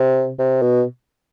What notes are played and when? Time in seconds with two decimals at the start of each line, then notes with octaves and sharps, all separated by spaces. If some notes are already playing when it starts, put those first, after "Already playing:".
Already playing: C3
0.39 C3
0.62 B2